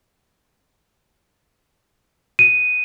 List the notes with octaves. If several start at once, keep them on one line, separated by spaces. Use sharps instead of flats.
D#7